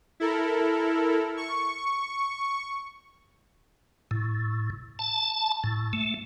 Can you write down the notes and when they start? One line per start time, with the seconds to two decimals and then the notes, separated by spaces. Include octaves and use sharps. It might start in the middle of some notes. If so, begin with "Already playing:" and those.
0.20 E4 A4 A#4
1.37 C#6
4.11 A2
4.99 A5
5.64 A2
5.93 A3